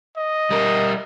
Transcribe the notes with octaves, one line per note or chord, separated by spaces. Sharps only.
D#5
G3 A#4